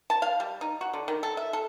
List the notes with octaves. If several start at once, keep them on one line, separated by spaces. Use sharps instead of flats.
A5
F5
G3
D#4
F#4
D3
D#3
A4
E5
A4